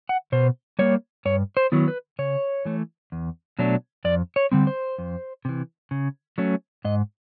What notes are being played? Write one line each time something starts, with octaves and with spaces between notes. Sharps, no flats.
F#5
B2 C5
G3 A#3 C#5
G2 C#5
C5
D#3 F#3 B3 E4
B4
C#3 C#5
E3 A3
E2
B2 F#3 A3 D4
F2 D5
C#5
D3 G3 C4
C5
F2
C3 E3
C#3
F#3 A3 C#4
G#2 D#5